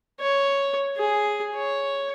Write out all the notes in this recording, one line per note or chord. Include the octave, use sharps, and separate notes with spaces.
C#5
G#4
C#5